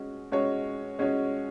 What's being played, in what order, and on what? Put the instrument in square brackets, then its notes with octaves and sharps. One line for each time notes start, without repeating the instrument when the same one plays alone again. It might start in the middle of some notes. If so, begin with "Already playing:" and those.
Already playing: [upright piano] G#3 C#4 F#4
G#3 C#4 F#4 C#5
G#3 C#4 F#4 C#5